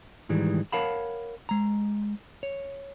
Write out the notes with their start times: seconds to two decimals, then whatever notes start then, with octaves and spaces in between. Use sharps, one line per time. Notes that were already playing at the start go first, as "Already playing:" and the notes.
0.29 G#2 D#3 E3 G3 G#3
0.72 A#4 C#5 F5 F#5 A5 B5
1.49 G#3 A#5
2.43 C#5